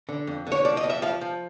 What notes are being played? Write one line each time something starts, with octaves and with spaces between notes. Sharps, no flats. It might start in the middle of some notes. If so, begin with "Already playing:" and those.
D3
F2
D3
C#5
F3 D5
D#5
F2
E5
F3 F5
F3